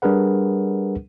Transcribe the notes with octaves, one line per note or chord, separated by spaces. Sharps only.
G3 D4 G#4 A#4 B4 F#5